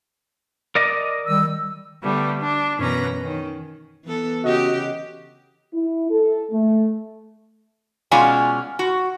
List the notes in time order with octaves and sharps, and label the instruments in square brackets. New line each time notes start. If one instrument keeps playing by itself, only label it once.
[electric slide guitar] A#4 D5 D#5
[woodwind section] D#3 G3 E6
[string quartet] D3 G3 A3 B3
D4
F#2 B2 E3 C#4 B4 A#5
D#3 C#4
[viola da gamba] E3 B3 A4
[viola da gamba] C#3 G4 [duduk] F#4 [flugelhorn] D#5
[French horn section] E4
A4
A3
[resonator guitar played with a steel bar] B2 G#3 C#4 F4 D5 G#5
F#4